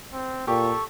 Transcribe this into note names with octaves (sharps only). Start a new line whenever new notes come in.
C4
A#2 G4 A4 C#6